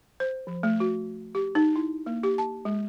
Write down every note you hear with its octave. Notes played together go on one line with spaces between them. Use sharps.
C5
F3
A3
F#4
G4
D#4
E4
A#3
G4
A5
G#3